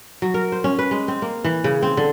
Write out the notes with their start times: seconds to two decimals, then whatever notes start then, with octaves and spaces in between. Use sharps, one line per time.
0.22 F#3
0.34 A#4
0.52 C5
0.64 C#4
0.79 B4
0.91 G#3
1.08 C4
1.22 A#3
1.44 E3
1.64 C#3
1.82 C4
1.97 D3